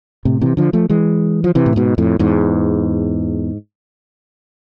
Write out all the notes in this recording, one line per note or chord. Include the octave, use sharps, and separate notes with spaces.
A2 C3
C3 E3
D3 F3
F3 A3
E3 G#3
F3
C3 E3
A2
G#2 B2
F2 A2
E2 G#2